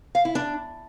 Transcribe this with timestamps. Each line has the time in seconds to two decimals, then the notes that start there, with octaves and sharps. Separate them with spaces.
0.15 F5
0.25 E4
0.35 D4